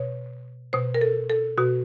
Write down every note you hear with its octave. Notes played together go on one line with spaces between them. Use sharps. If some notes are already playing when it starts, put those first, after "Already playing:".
Already playing: B2 C#5
B2 C5
A#4
A4
A4
B2 F#4